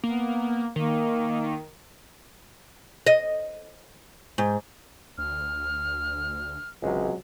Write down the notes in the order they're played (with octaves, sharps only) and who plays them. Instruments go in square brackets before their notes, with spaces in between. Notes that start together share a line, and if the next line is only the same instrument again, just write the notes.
[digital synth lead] A#3 [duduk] B3
[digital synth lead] D#3 [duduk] A#3
[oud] D#5
G#2
[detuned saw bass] D2 [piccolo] F6
[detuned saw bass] G#1 [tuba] C#2 [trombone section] C3 F#3 G#3